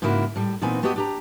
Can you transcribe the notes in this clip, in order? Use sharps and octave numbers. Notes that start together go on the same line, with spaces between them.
G#2 C#3 G#3 A#3 E4 F#4
A2 G3
A#2 E3 B3 C4 D#4 G#5
A3 B3 F#4 G4 D#5
D4 G4 A#5